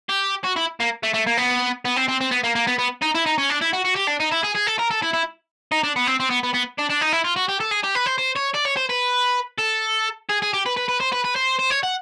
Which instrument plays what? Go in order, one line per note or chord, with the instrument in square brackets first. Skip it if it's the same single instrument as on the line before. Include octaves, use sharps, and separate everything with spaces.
[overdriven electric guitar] G4
F#4
E4
A#3
A3
A3
A#3
B3
B3
C4
C4
C4
B3
A#3
A#3
B3
B3
D#4
E4
D#4
C#4
D4
E4
F#4
F#4
G4
D4
D#4
E4
G#4
G#4
A4
A#4
A4
E4
E4
D#4
D4
B3
C4
C4
B3
B3
B3
D4
D4
D#4
E4
F4
F#4
G4
A4
G#4
G4
B4
C5
C5
C#5
D5
C#5
C5
B4
A4
G#4
G#4
G4
B4
B4
B4
C5
B4
B4
C5
C5
C#5
F#5